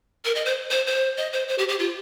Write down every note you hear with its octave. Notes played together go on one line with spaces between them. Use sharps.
A#4
D#5
C5
C5
C5
D#5
C5
C5
G4
G4
F4